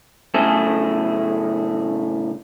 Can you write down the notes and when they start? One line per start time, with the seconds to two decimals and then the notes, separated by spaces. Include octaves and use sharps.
0.34 F#2 A2 C#3 A3 G#4 A4